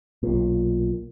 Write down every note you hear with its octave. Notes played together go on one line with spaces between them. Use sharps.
B1 A#2